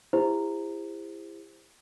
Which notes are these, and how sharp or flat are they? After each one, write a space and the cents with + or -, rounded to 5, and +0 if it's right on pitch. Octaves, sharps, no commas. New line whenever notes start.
E4 +20 G4 +45 C5 +0